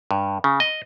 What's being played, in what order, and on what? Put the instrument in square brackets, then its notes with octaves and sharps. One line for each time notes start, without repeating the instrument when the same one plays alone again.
[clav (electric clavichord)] G2
C#3
D#5